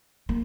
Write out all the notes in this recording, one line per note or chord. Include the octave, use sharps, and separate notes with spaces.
A#3